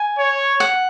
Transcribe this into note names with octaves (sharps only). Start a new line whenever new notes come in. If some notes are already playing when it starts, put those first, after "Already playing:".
Already playing: G#5
C#5
F#5